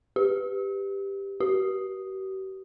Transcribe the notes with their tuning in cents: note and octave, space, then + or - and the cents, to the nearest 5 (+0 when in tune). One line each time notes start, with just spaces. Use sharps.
G4 +10
G4 -45